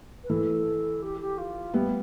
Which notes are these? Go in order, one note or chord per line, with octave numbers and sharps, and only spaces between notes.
B4
E3 A4
G4
G4
F4
G3 B3 E4